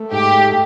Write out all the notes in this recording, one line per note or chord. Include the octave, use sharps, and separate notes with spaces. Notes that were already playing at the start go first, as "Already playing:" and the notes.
Already playing: A3
G#2 G4
A3